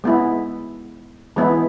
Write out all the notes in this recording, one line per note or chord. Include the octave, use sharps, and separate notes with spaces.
G#3 B3 E4
E3 G#3 B3 E4